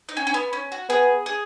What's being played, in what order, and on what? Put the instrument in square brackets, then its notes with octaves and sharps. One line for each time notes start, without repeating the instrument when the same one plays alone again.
[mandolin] D#4
C#4
C#4
B3
C#4
F#4
[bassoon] B3 [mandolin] G#4
[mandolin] G#4